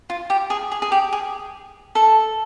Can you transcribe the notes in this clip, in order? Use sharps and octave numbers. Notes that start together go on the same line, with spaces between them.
F4
G4
G#4
G#4
G#4
G4
G#4
A4